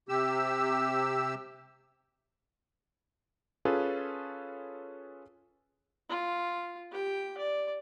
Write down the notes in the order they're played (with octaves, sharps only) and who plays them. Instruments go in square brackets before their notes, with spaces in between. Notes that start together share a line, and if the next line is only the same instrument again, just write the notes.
[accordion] C3 G4 E6
[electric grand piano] C#4 F4 G#4 A4 B4
[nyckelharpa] F4
G4 G5
D5